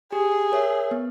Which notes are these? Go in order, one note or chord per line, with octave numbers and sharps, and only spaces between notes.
G4 G#4
A#4 C#5 E5
B3